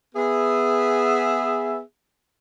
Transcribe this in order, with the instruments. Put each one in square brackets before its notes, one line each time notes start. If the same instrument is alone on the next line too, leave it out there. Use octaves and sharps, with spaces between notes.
[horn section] B3 G#4 E5